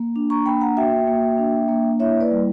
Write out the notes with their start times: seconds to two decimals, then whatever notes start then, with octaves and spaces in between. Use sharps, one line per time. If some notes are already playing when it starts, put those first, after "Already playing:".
Already playing: A#3
0.16 D4
0.30 A#5 C#6
0.46 A#3 G5 B5
0.61 F#5 A#5
0.77 F#4 E5 G5
1.07 A#3
1.38 D4
1.69 A#3
2.00 E4 C#5 E5
2.20 B4 D5
2.31 G3